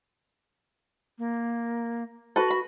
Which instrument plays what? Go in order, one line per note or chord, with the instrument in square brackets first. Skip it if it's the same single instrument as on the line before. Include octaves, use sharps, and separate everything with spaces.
[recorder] A#3
[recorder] F#4 [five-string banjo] A4 B4
[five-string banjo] B5